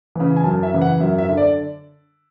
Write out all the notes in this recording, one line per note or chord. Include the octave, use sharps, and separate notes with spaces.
C#3 E3
G#5
F#2 A5
E5
C#3 E3
F#5
F#2 E5
E5
D3
D5